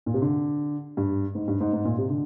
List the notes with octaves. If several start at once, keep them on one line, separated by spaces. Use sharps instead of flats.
A#2
C3
D3
G2
G#2
G2
G#2
G#2
A#2
C3
D3